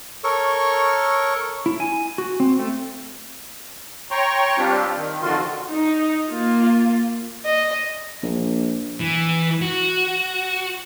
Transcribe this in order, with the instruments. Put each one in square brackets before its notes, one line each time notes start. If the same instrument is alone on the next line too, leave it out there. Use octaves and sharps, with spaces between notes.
[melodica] A4 A#4 C#5 C#6
[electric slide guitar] E4
G#5
F#4
C4
A3
[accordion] C#5 G5 A#5 C6 C#6
G3 C4 D4 F4 G4
D#3
F2 D3 D#3 F4 F#4 C6
[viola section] D#4
A#3 F4
[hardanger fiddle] D#5
[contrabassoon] A#1
[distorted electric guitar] E3
F#4